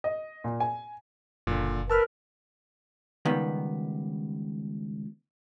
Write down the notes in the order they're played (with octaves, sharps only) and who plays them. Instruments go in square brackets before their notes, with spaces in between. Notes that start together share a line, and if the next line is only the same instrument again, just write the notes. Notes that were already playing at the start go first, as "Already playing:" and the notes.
[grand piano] D#5
A#2
G#5
[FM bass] F#1 [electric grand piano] A#2 D3
[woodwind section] A#4 B4 [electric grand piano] A5 E6 F6
[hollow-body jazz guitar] C#2 D#3 G3 B3